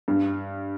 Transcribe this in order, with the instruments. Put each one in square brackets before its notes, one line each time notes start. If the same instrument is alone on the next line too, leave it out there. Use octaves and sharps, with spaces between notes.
[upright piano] G2